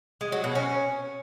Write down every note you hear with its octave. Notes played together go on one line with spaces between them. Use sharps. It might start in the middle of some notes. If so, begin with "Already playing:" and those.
G#3
F#3
B2
C#4